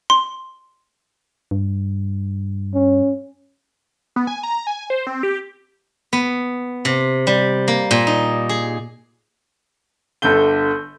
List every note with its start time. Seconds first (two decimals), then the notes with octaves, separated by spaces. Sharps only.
0.10 C6
1.51 G2
2.74 C#4
4.16 B3
4.27 G#5
4.43 A#5
4.67 G#5
4.90 C5
5.07 C4
5.23 G4
6.13 B3
6.85 C3
7.27 G3
7.68 A#3
7.91 A#2
8.07 D#4
8.49 G#4
10.22 G1 D3 A4 G6 G7